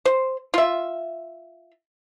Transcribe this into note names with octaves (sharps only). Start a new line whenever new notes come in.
C5
F4 E5